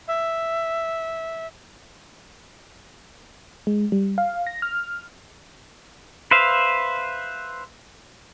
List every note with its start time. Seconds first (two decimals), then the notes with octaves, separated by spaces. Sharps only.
0.08 E5
3.67 G#3
3.92 G3
4.18 F5
4.47 A#6
4.62 F6
6.31 B4 C5 E5 F5